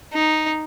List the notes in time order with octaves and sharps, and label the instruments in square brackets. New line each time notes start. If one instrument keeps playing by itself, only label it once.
[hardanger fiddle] D#4